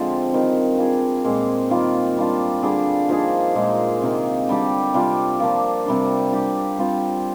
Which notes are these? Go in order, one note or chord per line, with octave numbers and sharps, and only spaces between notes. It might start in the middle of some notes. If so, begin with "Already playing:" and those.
Already playing: D3 F3 G#3 C4
D#3 G3 C4
G3 D4 F4 G#4
A#2 G#3 C4
D#3 G3 A#3 F4
G3 D4 F4
D3 G3 D4 G#4
F3 A#3 D#4 G#4
A#2 G#3 D#4
C3 D#3 A#3
D3 G3 D4 G4
C3 G3 D4 F4
F3 A#3 D4
C3 G3 D4
G3 D4 G4
G3 C4 F4